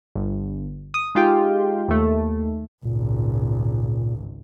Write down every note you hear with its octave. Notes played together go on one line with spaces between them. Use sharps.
G1
D#6
G#3 D#4 F4 G4 G5
D#2 A3
G#1 C#2 A#2